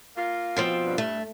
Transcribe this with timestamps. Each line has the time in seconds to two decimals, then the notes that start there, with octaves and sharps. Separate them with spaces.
0.17 A#3 F4
0.57 B2 F3 C4
0.84 G2
0.98 A3